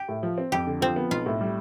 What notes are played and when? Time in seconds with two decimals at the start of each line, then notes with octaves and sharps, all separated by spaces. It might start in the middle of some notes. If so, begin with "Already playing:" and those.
Already playing: G4
0.09 A2
0.23 F3
0.38 C4
0.52 F2 G4
0.67 D3
0.81 F3 C4
0.96 B3
1.11 B1 F4
1.26 A2
1.41 G3